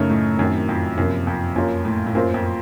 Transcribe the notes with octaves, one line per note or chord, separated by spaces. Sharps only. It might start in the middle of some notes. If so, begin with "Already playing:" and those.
Already playing: F#2 C#3 A3 D#4 A#4 C#5
A2
F#2 D#3 F#3 C4
F2
F#2 C3 F3 A#3
F2
F#2 A#3 F4 A#4 C#5
A2
A2
F#2 A#3 F4 C5
F2